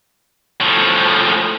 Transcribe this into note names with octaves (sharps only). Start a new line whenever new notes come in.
A2 F3